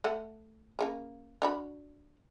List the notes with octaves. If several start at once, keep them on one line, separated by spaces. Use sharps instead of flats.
A3 F#5
C#3 A3 A#3
D4 F#4 B5